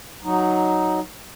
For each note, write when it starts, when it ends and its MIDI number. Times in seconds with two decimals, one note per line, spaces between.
0.24 1.00 54
0.24 1.00 63